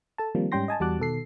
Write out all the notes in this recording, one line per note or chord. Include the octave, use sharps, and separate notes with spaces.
A4 A5
D#3 F3 G3 A#3 C4
G#2 G3 C#4 G5 C6 A#6
D#5 G#5 A5
E2 G3 F#4 A5 D6 F#6
B2 D#3 A4 C7